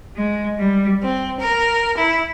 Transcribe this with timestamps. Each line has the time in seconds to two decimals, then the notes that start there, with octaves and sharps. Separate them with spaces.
0.15 G#3
0.57 G3
1.03 C4
1.40 A#4
1.97 E4